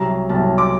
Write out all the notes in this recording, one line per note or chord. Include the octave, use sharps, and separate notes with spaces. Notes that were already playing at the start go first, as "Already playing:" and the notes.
Already playing: C2 C3 F#3 A#5
C2 C3 F#3 A5
D6